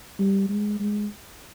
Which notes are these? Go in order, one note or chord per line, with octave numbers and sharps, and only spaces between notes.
G3
G#3
G#3